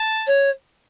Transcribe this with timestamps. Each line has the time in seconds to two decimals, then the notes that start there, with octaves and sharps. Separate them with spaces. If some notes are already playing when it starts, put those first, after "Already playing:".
Already playing: A5
0.27 C#5